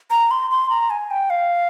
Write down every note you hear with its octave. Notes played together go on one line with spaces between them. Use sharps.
A#5
C6
C6
A#5
G#5
G5
F5